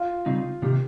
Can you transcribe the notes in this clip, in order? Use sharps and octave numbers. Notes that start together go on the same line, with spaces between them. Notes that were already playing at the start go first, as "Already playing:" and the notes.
Already playing: F4
C#3 G3 C4 D#4
C3 D#3 A#3 G4